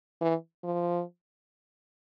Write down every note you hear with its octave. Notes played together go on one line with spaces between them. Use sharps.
E3
F3